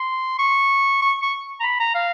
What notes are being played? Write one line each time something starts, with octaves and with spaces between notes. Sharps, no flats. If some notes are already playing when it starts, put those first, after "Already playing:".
Already playing: C6
C#6
C#6
C#6
A#5
B5
A#5
F5